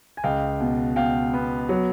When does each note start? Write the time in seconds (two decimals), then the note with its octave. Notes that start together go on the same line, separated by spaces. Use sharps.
0.17 G#5
0.24 C#2 F5 G5
0.60 B2
0.96 B2 F5 G5
1.34 B3
1.69 F#3